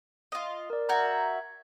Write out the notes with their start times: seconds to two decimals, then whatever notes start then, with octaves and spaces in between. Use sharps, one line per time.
0.32 F4 D#5
0.70 A#4 D5
0.89 F#4 A#4 E5 A#5 G6 G#6
1.13 G#6